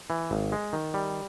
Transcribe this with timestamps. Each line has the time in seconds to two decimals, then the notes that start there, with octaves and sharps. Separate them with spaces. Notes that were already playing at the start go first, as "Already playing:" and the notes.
0.10 E3
0.31 G#1
0.52 G#3
0.73 D#3
0.94 G3